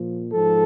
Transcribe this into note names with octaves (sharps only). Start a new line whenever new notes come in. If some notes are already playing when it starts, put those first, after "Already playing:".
Already playing: A#2 F3
G#2 F3 A4